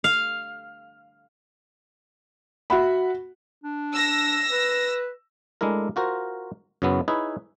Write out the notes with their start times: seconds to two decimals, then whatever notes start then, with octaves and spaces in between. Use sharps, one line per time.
0.04 F5
2.70 F#4 E5 F#5 B5
3.64 D4
3.92 E6 A#6
4.52 B4
5.61 G#3 A3 D4 E4 A#4
5.96 F4 F#4 A#4 C5
6.82 F#2 C#3 F#3 B3 E4
7.08 D#4 E4 G#4 B4 C#5